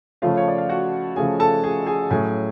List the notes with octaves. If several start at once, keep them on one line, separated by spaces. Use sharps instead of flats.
C#3 F3 A3 C#4 F4 F5
C#5
D5
F5
F#4 F#5
C#3 F3 A3 C#4 G#4 G#5
A4 A5
G#4 G#5
G#4 G#5
A2 F#3 A3 C#4 G#4 G#5